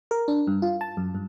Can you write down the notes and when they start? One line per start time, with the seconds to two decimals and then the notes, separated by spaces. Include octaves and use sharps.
0.11 A#4
0.28 D4
0.47 G2
0.62 F4
0.81 A5
0.97 F#2
1.15 G2